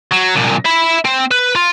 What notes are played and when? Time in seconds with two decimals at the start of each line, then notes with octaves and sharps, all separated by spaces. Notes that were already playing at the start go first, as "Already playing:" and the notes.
0.11 F#3
0.35 C2 A#2
0.65 E5 B5
1.05 C4
1.31 B4
1.56 F4